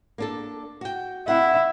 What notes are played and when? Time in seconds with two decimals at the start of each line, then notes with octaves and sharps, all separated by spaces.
0.18 A#3 D4 A4
0.81 F#4 G5
1.28 C4 E4 F#5